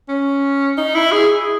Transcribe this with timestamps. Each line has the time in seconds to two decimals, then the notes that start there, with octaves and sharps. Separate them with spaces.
0.09 C#4
0.78 D#4
0.95 E4
1.12 G#4